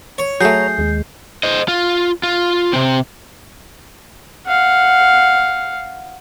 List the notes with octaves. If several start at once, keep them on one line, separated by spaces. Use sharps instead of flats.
C#5
F#3 A3 G#4 C#5 A#5 G6 C7
D#2 G#3
C5 D#5
F4
F4
C3 C4
F5 F#5